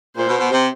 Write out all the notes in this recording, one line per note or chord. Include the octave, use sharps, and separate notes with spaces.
A#2 C5
B2
B2
C3